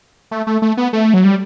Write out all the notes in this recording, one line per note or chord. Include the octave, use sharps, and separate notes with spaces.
A3
A3
A3
B3
A3
F#3
G3